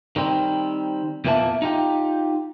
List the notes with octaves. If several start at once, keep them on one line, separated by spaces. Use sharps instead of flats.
D#3 G3 C4
E2 A#2 E3 A#3 E5 A5
D#4 F4 G4